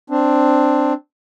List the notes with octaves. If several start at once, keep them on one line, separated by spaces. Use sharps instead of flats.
C4 D4